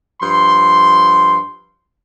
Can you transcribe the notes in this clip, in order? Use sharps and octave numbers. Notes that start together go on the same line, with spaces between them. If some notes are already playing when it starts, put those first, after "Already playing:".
G2 F3 C6